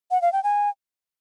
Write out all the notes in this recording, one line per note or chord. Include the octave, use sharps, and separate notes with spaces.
F#5
F5
G5
G#5